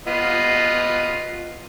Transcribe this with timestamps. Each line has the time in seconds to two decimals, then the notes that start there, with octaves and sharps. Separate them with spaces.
0.07 B3 F4 D#5